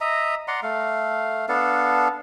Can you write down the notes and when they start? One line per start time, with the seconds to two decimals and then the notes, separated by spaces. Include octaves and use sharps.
0.01 D#5 E5 A#5
0.48 D5 F#5 A#5 C6
0.63 A3 F5
1.49 B3 D4 A4 F5